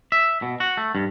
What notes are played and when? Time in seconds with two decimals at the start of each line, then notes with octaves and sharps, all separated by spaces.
0.12 E5
0.42 B2
0.60 F#4
0.77 A3
0.95 G2